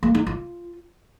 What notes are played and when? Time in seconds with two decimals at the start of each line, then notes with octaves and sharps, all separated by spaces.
0.03 A#3
0.15 D#4
0.27 F4